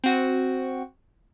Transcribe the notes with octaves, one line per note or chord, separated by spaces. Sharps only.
C4 F#4